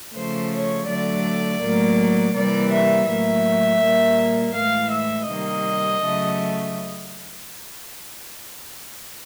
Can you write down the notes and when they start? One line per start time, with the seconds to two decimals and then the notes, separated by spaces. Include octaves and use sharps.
0.14 C#3 F3 A3 C5
0.52 C#5
0.88 D3 F#3 A3 D5
1.62 A2 F#3 A#3
2.34 C3 E3 G3 A#3 D5
2.71 E5
3.08 A2 F#3 A#3 E5
3.81 A#2 G3 A#3
4.54 A2 E3 G#3 F5
4.91 E5
5.28 C3 D#3 G3 A#3 D#5
6.01 C#3 F#3 A3